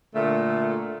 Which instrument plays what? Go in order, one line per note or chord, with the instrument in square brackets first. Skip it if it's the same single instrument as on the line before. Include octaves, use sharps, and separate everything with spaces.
[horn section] A#2 D3 A3